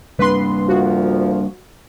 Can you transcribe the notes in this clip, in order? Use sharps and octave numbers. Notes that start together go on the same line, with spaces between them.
G3 A#3 D4 B4 C6
D2 A#2 F3 F#4